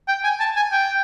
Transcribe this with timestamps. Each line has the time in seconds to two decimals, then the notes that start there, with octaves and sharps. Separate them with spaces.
0.08 G5
0.24 G#5
0.40 A5
0.56 G#5
0.72 G5